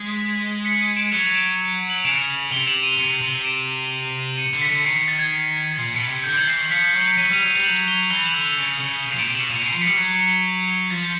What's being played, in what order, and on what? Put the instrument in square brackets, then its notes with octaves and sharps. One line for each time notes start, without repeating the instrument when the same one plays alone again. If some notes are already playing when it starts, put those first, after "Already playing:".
Already playing: [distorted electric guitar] G#3 [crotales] B6
[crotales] B6 C#7
C#7 D#7
D7 E7
[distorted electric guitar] F#3 [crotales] D#7 F7
[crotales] D7 E7
F#7
F7
[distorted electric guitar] C#3 [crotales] D7 E7
[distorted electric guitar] C3 [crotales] F7 G7
[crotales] E7 F#7
D#7 F7
[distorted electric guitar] C3
C3
[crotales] D7 E7
C#7 D#7
[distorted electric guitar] D3
[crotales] B6 C#7
[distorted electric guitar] D3
[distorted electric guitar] D#3 [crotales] C7
[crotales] B6
A6
G#6
[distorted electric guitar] A#2
B2
C3
[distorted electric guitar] D3 [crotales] G6
[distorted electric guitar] D#3 [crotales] G#6
[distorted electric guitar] E3 [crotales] C7
[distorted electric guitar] D#3
[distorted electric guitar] F3 [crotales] B6 C#7
[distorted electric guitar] F#3
[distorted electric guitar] F#3 [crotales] C#7 D#7
[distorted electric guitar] G3 [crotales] D#7 F7
[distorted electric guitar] F#3
[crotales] D#7 F7
[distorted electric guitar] G3
[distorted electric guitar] F#3 [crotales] E7 F#7
[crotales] F7 G7
[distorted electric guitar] E3 [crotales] F7 G7
[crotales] E7 F#7
[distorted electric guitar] D3
[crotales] D#7 F7
[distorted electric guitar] C#3
C#3
[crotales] D#7 F7
[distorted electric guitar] A#2 [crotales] D7 E7
[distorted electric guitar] C3
[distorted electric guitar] B2 [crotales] E7 F#7
[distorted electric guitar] A#2 [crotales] D#7 F7
[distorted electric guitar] B2 [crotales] C7
[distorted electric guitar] F3
[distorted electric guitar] G3 [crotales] B6 C#7
[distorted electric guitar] F#3
F3